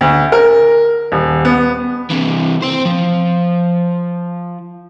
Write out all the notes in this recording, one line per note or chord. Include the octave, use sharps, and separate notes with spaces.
D2
A#4
D#1
B3
C3 E3
C4 C5
F3